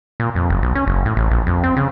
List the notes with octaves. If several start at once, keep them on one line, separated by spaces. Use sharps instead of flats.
A#2
F2
F#1
B1
C#4
F#1
A2
A1
A#1
F2
C4
C#3